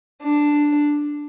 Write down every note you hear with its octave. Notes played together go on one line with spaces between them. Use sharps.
D4